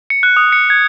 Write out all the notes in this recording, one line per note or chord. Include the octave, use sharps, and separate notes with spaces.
C#7
F#6
D#6
C#7
G#6